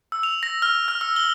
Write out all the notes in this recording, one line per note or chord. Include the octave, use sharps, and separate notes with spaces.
E6
F7
A#6
F6
F6
E6
G7